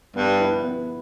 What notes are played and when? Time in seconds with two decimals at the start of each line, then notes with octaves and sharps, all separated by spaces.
0.16 G2 B3
0.40 E4 B4
0.64 B3